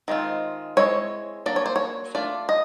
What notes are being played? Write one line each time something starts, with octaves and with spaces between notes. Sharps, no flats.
D#3 G#3 C4 F4
G#3 C4 E4 C#5
F#3 A#3 D4 D5
C#5
C5
C#5
A3 D4 F4 D5
D#5